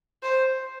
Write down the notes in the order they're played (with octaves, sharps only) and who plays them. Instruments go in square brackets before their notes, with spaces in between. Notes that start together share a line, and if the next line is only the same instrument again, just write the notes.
[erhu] C5